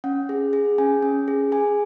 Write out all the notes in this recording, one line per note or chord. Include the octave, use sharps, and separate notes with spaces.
C#4 F#5
G#4
G#4
C#4 G#5
C#4
G#4
G#4 G#5